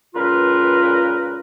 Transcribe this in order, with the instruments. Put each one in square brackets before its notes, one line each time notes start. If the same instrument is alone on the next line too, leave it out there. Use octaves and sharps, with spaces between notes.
[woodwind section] C#2 A#2 F4 A#4 B4